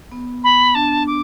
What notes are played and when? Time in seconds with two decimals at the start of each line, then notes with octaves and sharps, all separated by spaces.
0.12 B3
0.43 B5
0.74 D4 A5
1.06 D6